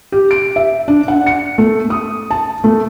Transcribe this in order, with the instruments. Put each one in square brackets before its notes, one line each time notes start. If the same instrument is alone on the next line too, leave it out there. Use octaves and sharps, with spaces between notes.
[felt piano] G4
D7
E5
D4
F#5
C#7
A3
D#6
A5
A3